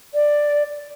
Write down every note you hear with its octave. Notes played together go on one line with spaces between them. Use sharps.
D5